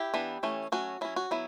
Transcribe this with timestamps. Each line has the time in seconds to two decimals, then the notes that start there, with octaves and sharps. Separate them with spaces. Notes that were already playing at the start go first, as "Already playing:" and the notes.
Already playing: E4 G4
0.14 E3 B3 D4
0.43 E3 A3 C#4
0.72 F#3 A3 C#4 F#4
1.01 F#3 C#4 E4
1.16 F#4
1.31 F#3 B3 E4